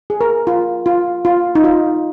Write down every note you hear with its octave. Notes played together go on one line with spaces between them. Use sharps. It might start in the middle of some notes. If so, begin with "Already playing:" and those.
G#4
A#4
F4
F4
F4
D#4
F4